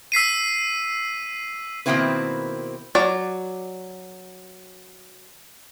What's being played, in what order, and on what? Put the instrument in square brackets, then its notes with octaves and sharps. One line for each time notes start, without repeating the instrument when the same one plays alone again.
[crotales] E6 B6 C7 D#7
[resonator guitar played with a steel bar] B2 D#3 A#3 C4 E4 B4
[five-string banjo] F#3 D5